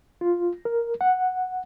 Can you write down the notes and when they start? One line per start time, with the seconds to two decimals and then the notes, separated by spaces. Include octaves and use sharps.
0.21 F4
0.65 A#4
1.01 F#5